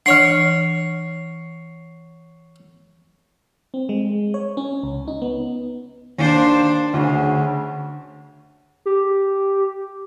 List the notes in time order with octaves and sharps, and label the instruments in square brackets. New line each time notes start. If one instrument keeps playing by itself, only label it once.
[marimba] E3 D4 [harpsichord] C#5 F#5 [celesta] C7
[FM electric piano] C4
G#3
C#5
C#4
C#2
D#4
B3
[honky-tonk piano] D#2 [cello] D4 C5
[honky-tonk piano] D2 [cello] C#3
[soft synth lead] G4